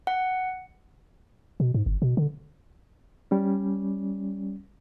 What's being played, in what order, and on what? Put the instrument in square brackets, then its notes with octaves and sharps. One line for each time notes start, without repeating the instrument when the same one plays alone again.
[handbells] F#5
[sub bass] B2
G#2
G1
B2
D3
[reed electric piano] G3 C#4